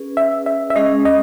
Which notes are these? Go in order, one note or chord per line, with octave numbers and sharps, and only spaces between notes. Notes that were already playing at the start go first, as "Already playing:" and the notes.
Already playing: C#4 G#4 B4
E5
E5
E5
G#3 C#4 G#4 D#5
D#5